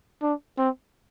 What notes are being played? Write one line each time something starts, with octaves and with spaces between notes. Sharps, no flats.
D4
C4